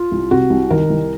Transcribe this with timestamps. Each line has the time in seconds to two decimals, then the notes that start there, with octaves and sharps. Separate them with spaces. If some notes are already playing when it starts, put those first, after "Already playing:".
Already playing: F4
0.12 C2
0.31 C3 F#4
0.50 C2
0.71 D#3 A#4
0.90 C2